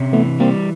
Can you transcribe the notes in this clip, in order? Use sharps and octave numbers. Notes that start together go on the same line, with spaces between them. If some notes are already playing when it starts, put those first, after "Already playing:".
Already playing: C3 C#4
E3 A3 B3
G3 A#3 C4